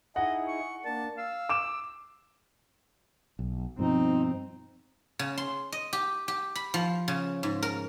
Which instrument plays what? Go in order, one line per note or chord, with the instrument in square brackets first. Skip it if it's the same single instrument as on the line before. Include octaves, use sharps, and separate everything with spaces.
[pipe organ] D#4 E4 G#4 [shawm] D#5 [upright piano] F#5
[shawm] C#6
[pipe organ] A#3 D4 [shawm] A5
[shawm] F5 [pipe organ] E6
[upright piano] D6 E7
[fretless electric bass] B1
[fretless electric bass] G2 B2 F3 [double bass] C4 [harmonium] D#4
[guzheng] C#3
C6
D#5
G4
G4
B5
F3
C#3
G#2
A#4